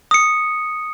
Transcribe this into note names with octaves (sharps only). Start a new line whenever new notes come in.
D#6 C#7